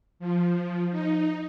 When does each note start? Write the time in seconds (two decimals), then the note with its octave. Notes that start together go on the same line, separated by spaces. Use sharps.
0.19 F3
0.91 D#4